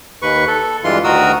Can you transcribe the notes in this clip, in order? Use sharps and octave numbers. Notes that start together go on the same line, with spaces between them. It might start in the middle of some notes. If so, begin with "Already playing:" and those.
D#2 B4 C#6
A4
G2 E3 G#3 F4 C6
D2 D#3 F#4 A#4 D#6 E6